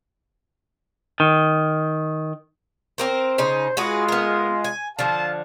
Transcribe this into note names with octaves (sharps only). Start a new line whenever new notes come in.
D#3
C4 A#4 C5
C#3 D#4 C5
G#3 F4 F#4 G#4 B4
B3 A#4
G#5
D3 F3 F5 A5